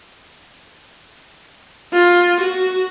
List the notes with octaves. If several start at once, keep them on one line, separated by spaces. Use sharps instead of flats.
F4
F#4